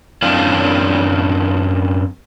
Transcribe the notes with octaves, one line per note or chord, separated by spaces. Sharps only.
F#2 C4 D4 E4 D5 F5